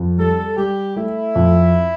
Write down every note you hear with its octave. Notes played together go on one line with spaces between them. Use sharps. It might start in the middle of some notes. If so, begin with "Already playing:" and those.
Already playing: F2
G3 A4
G3 G4
A3 E4
F2